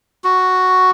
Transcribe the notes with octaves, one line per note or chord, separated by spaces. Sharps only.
F#4